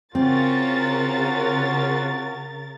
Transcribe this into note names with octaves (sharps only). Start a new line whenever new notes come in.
C#3 C4 C#4 F4 F#4 A#4 A6